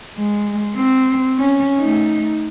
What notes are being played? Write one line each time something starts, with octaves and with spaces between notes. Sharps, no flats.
G#3
C4
C#4
A3 D#4